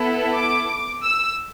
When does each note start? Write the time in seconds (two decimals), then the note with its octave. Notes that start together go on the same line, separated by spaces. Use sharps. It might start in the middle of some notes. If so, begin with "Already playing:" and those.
Already playing: B3 E4 A4
0.34 D6
1.04 E6